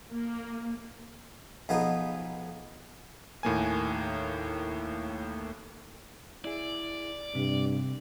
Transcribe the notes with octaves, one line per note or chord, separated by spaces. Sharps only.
A#3
B1 F3 B3 D#4 G#4
D#2 A2 A#3 G#5
E4 G#4 D5
G2 C3